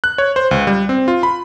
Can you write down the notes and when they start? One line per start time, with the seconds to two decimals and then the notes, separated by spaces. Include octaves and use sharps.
0.04 F#6
0.18 C#5
0.36 C5
0.51 C#2
0.67 G3
0.89 C4
1.08 F4
1.23 B5